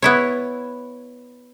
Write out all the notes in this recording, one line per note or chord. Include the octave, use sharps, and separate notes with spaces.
B3 E4 C#5